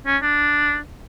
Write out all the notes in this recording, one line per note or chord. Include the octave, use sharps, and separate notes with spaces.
C#4
D4